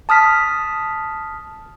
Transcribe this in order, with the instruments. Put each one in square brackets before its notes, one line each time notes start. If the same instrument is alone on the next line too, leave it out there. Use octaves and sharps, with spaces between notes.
[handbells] A5 D#6 F6 B6